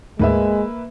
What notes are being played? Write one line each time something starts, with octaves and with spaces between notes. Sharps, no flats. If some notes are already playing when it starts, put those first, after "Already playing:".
D2 G#2 G#3 A#3 B4 E5